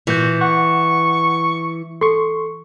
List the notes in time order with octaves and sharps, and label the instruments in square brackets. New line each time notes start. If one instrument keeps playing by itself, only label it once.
[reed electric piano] A#2 G6 [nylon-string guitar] E3 [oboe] F#4
[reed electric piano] F#5 [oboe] C#6
[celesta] A4 [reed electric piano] C6 C#6